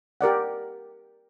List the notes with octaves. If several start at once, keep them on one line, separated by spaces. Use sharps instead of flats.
G4 A#4 D5 F#5